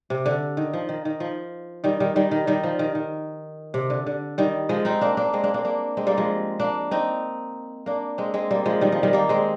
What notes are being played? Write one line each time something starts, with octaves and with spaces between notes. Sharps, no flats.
C3
D3
D#3
F3
D#3
D#3
F3
D#3 G3
D#3 G3
D#3 G3
D#3
D#3 G3
F3
D#3
D#3
C3
D3
D3
D#3 G3
F3 G#3
C4 D#4
A#3 D4
A#3 D4
G#3 C4
A#3 D4
A#3 D4
A#3 D4
G#3 C4
G3 A#3
F3 G#3
A#3 D4
C4 D#4
A#3 D4
G#3 C4
G#3 C4
G3 A#3
F3 G#3
D#3 G3
F3
D#3 G3
G3 A#3
G#3 C4